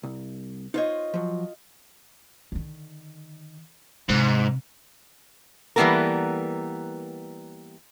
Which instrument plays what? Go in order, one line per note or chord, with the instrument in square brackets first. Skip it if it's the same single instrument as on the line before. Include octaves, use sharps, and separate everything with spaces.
[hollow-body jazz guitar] C2
[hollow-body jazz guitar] D#4 C5 C#5 [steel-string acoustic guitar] F4 D#5
[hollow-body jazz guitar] F3 F#3
[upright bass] D3 D#3
[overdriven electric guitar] G#2 [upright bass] C3
[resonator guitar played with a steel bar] E3 G3 A#3 B3 A4 A#4